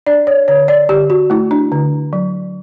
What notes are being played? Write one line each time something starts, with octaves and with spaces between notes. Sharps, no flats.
D4 D5
C#5
D3 C#5
D5
D3 G4
F#4
A3 E4
D4
D3
F#3